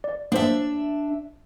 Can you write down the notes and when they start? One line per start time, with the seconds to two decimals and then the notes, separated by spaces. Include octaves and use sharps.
0.04 D5
0.32 A#3 D4 C5 E5